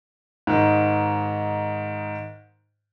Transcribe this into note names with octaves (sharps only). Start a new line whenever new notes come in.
G#2 D#3